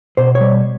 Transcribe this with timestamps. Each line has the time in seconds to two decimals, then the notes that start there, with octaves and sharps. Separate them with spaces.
0.17 B2 C5
0.35 C#5
0.41 G3